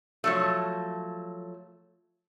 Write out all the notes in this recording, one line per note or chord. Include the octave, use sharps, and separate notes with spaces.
F3 F#3 A3